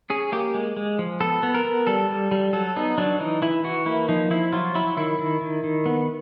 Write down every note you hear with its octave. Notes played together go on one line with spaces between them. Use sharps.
C#4 G#4
A#3 G4
G#3
G#3
F3
B3 A4
B3
A#4
B3
G3 A4
G3
G3
F#3 A4
B3 D#4
F#3 D4
E3 D#4
E3 E4
E3 F#4
A#3 E4
F3 D#4
F3 E4
F#3 F4
F#3 E4
D#3 E4
D#3
D#3
D#3
B3